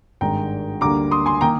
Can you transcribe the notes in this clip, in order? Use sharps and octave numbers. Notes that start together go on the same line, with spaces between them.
G#1 G2 D#3 G#3 G5 A#5
D2 D3 G3 A#3 A#5 D6
C6 D#6
G#5 C6
D#3 A#3 G5 A#5